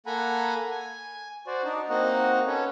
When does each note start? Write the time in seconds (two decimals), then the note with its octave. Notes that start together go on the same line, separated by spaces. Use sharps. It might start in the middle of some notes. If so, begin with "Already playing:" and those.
0.06 A#3 A4 F#5 G#5 A#5 B5
0.70 G#5
1.47 F#4 C5 D5
1.64 D4 D#4
1.90 A#3 C4 D#4 F#4 D#5 F#5
2.47 C#4 A4 B4 C#5